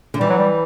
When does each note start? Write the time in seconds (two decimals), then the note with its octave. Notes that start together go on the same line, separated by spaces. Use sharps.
0.14 D3
0.20 E3 G3
0.30 F#3
0.39 G3